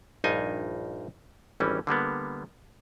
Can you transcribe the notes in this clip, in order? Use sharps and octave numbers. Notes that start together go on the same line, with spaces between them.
A#1 G2 D#4 F4 D#5 G#5
G#1 E3 G3 C#4
D3 G3 A#3 B3